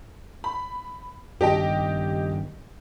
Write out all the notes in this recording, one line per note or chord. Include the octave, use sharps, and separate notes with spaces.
B5
G2 D#3 G4 D#5 G5